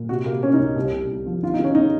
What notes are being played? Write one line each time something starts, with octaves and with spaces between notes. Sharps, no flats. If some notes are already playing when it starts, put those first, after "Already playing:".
Already playing: A#2
C3 F#4
C3 A#3
C3 C#4
D#4
C#2
C2
C2
C2
F3
D#3 F4
D#4
D#3 C#4
D#4